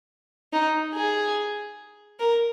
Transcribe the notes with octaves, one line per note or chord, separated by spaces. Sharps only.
D#4
G#4
A#4